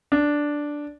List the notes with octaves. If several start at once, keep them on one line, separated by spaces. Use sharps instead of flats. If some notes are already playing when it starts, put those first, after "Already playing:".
D4